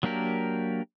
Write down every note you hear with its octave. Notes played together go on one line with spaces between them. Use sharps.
F#3 A#3 D4 G4 A#4